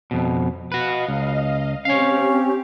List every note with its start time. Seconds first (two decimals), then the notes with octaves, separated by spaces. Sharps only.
0.11 F2 B2
0.72 F#4 B4 D#5 F5
1.08 C#2
1.85 C4 C#4 G4 C#5 F5